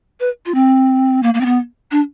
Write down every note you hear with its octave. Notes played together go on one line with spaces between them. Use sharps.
B4
F4
C4
A#3
A#3
C4
B3
D4